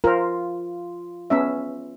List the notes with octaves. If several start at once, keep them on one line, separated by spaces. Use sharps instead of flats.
F4 A#4 C5
B3 C#4 E5